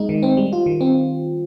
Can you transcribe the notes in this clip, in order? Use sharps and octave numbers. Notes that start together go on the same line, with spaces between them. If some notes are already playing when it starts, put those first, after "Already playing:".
Already playing: G#3 D#4
D#3
C4
G3
F4
D#3
C4